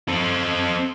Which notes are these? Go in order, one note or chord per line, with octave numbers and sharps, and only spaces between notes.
C4 A4